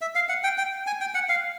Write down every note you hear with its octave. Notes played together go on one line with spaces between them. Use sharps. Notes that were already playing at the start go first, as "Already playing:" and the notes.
E5
F5
F#5
G5
G5
G#5
G5
F#5
F5